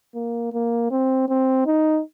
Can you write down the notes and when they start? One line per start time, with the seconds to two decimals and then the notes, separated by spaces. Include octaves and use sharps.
0.15 A#3
0.53 A#3
0.91 C4
1.29 C4
1.66 D#4